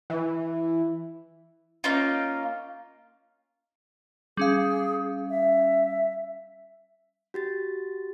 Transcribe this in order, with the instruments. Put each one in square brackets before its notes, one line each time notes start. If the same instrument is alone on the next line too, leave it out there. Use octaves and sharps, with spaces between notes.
[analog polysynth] E3
[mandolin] A#3 C#4 D#4 F4
[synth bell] G3 C#4 F5 [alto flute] G#4
[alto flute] E5
[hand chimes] F#4 G4 A6